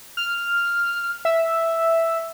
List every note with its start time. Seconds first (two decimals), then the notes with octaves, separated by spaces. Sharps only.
0.17 F6
1.25 E5